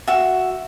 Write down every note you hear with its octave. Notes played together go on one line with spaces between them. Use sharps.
F#4 E5